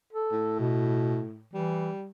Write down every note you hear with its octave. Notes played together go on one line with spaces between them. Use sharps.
A4
A2
B2
E3 G3